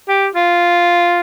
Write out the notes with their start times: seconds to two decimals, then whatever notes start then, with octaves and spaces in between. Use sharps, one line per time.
0.09 G4
0.35 F4